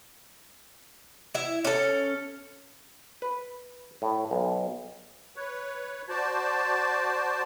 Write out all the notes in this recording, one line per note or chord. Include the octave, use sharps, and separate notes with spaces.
E4 E5
C#4 A4
B4
A2
B1
B4 C#5
F#4 C5 D5 A5